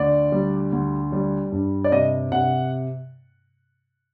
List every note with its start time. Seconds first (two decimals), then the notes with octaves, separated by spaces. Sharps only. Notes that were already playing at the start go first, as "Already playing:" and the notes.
Already playing: D2 D5
0.32 G3
0.72 D2
1.12 G3
1.52 G2
1.84 D5
1.92 C3 D#5
2.32 C3 F#5